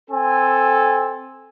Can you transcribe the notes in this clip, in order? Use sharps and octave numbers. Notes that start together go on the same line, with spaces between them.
C4 A4 G#5